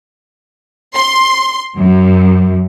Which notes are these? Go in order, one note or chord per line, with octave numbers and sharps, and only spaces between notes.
C6
F#2